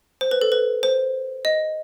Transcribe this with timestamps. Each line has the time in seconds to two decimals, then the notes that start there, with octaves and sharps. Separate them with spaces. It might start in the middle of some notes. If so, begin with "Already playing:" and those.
0.21 C5
0.31 B4
0.41 A4
0.52 B4
0.83 C5
1.45 D#5